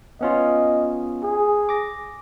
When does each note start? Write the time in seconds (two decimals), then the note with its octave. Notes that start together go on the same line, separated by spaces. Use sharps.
0.21 B3 C#4 F4 D#5
1.23 G#4
1.69 D6 A#6